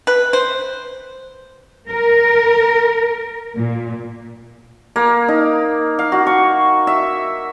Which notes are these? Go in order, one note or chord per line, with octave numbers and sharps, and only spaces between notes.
B4
C5
A#4
A#2
A#3
D#4
F5
F#4
C#6
E5